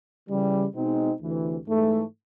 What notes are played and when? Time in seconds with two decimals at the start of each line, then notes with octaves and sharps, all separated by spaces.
0.28 C#3 E3 G3
0.74 B2 G#3 C4 D#4
1.20 D2 C3 E3
1.66 G#2 E3 A3